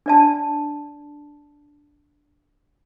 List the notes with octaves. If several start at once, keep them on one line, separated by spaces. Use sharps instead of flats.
D4 D5 A5